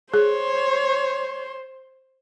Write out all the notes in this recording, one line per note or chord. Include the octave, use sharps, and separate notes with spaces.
G#4 C5 C#5